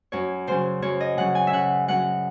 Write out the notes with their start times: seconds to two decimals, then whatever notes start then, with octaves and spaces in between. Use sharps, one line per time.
0.12 F#2 C#5
0.47 C#3 F#3 C#4 C5
0.82 F#2 C#5
1.01 D#5
1.17 C#3 F#3 C#4 F#5
1.35 G#5
1.47 E5
1.53 C#3 F#5
1.88 F#3 C#4 F#5